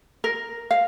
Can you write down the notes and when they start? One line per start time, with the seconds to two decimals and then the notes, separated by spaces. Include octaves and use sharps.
0.24 A#4
0.71 F5